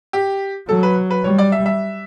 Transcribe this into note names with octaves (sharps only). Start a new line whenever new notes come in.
G4
F#3 A4
B4
B4
G3 C#5
D5
E5
E5